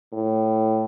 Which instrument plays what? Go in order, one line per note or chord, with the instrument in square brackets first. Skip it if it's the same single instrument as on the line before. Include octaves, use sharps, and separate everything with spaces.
[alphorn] A2